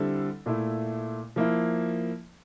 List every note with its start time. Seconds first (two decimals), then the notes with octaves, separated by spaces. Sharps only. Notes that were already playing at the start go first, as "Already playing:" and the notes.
Already playing: D3 G3 C4 E4 A4
0.46 A#2 A3 E4
1.36 F3 A#3 E4